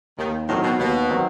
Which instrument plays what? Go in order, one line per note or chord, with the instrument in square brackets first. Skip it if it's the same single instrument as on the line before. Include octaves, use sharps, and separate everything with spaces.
[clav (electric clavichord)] D#2 [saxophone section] D#3
[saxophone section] A2 [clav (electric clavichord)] D#3 F#3 C4
[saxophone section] B2
[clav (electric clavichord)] D#2 [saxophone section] B2
[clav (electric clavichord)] D#3 F#3 C4